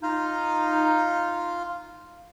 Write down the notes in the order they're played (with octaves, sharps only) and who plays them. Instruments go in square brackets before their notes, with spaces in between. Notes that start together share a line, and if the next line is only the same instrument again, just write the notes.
[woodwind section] D#4 [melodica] F4 F5